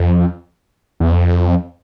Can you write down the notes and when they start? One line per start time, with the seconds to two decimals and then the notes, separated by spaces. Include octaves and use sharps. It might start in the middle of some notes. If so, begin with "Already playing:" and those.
Already playing: F2
1.00 E2
1.11 F2